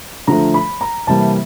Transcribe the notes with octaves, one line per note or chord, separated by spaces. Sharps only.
D3 F3 A3 A#5
B5
A#5
C3 E3 G3 A#3 A5